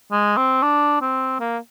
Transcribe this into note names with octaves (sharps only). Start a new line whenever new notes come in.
G#3
C4
D4
C4
A#3